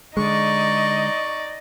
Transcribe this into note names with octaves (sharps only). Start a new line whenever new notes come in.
D3 G#3 D#4 D5 D#5 C#6